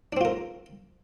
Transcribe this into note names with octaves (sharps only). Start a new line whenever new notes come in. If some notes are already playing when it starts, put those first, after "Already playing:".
C4 D4 F4 A#4